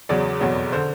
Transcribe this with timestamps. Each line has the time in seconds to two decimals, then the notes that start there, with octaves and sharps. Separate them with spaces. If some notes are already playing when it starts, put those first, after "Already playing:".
0.09 E2 C#3 F#3 D5
0.40 F1 E2 B2 F#3
0.72 D3 C5